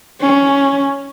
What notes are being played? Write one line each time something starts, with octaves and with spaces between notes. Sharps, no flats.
C#4